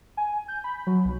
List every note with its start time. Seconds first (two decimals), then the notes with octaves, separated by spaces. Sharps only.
0.17 G#5
0.48 G6
0.64 B5
0.87 F#3
1.05 B1